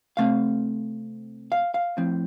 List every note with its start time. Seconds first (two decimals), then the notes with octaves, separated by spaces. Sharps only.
0.17 C3 A3 C4 F5
1.52 F5
1.74 F5
1.97 A2 F3 C4